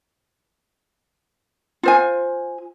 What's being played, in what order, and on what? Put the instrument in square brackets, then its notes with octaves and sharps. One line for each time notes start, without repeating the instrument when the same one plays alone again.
[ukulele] F4 C5 G#5